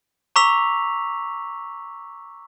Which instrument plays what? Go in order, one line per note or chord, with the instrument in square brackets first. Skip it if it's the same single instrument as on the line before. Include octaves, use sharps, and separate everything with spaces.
[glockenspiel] A#5 C#6 D6 E6 B6 F7